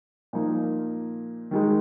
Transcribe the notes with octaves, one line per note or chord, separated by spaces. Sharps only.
A#2 F3 A#3 D#4
D#3 G#3 D#4